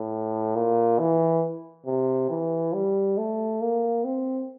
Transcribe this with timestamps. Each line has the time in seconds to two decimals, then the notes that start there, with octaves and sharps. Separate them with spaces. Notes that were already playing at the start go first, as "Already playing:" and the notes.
Already playing: A2
0.55 A#2
0.99 E3
1.86 C3
2.30 E3
2.74 G3
3.18 A3
3.62 A#3
4.05 C4